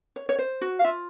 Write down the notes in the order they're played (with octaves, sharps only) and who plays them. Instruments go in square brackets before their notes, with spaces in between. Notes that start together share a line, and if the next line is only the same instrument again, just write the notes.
[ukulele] C#5
C#5
C5
F#4
[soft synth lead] F5
[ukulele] F4 [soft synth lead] E5